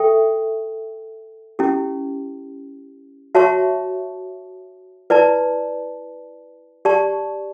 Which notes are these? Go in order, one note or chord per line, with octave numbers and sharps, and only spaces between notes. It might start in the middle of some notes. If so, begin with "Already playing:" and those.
Already playing: A4 E5 G5 C#6
C#4 E4 G4
F#4 C#5 E5 A5 C#6
E4 B4 D5 A5
G4 D5 A5 C#6